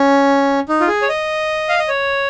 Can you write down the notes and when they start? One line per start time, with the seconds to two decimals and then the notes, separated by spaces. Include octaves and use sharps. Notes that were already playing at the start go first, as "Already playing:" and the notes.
Already playing: C#4
0.69 D#4
0.81 F4
0.88 G#4
1.02 C#5
1.09 D#5
1.69 F5
1.79 D#5
1.88 C#5